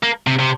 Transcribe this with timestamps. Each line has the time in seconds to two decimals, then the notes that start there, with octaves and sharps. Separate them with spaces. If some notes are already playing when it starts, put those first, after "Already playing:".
0.03 A#3
0.27 C3
0.39 C3